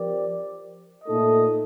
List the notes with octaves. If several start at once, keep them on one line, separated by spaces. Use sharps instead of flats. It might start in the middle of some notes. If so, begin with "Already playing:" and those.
Already playing: F3 C4 G4 A#4 D5
A#2 A3 D#4 A4 D#5